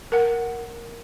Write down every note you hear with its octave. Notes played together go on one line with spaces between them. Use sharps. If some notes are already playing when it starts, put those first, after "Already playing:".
A#4 F#5